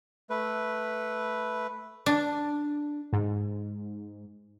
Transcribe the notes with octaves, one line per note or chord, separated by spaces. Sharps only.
A3 B4
D4
G#2